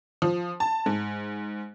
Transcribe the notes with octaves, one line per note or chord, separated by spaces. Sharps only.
F3
A5
G#2